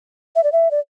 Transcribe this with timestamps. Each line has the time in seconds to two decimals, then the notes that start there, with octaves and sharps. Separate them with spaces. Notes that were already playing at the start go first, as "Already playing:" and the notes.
0.36 E5
0.44 D5
0.52 E5
0.71 D5